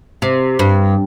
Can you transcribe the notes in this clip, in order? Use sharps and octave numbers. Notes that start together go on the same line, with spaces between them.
C3
G2